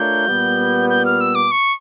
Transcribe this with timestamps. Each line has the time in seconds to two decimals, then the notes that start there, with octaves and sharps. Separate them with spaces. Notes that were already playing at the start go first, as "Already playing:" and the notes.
Already playing: A3 D4 F4 A#4 C#5 G6
0.28 A#2 G3 B3
0.90 G6
1.05 F6
1.21 E6
1.35 D6
1.51 C#6